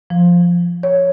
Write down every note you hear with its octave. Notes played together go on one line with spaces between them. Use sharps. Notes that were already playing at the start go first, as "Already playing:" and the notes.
F3
C#5